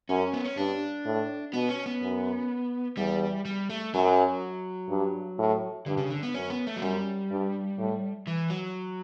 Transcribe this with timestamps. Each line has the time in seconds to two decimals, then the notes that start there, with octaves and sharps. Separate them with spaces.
0.09 F#2 C#4
0.33 B3
0.44 C#4
0.57 G2 D4
1.06 A2
1.54 B2 B3
1.69 C#4
1.86 B3
2.02 F#2
2.97 E2 G3
3.45 G3
3.70 A3
3.94 F#2 F#3
4.89 G2
5.39 A2
5.86 G2 D3
5.98 C#3
6.10 D3
6.23 B3
6.34 F#2 C#4
6.50 B3
6.67 A3
6.76 F#3
6.82 F#2 G3
7.31 G2
7.79 A2
8.27 E3
8.50 F#3